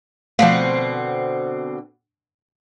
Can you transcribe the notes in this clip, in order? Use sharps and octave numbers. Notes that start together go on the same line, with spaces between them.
B2 D3 F3 A3 C4 F5